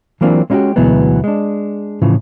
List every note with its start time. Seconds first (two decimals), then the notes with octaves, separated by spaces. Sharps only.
0.21 E3 F#3 A#3 C4 D4 F4
0.50 G#3 C#4 D#4 E4 F#4 G4
0.76 D2 B2 E3 F#3 G#3 B3
1.24 G#3 D4
2.02 A2 C#3 E3 F3